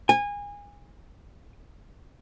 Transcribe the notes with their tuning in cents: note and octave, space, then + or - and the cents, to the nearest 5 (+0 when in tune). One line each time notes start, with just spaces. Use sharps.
G#5 -25